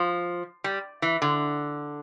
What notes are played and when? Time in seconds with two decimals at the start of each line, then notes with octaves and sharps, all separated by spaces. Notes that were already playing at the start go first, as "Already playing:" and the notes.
Already playing: F3
0.64 G3
1.02 E3
1.22 D3